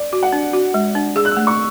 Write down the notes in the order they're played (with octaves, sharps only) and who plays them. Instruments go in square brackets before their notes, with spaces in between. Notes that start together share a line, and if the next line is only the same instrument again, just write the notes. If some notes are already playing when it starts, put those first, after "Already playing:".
Already playing: [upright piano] D5
[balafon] F#4
[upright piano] F#5
[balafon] D4
F#4
G#3
D4
[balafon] G#4 [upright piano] E6
[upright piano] F#6
E6
[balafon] A3
[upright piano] C#6